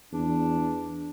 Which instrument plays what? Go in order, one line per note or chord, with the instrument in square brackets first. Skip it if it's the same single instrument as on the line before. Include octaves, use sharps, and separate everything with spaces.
[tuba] E2 [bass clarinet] D4